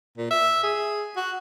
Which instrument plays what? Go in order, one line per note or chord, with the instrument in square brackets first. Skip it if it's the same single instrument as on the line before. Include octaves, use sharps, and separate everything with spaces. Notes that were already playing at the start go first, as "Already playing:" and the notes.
[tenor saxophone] A#2
E5
G#4
F#4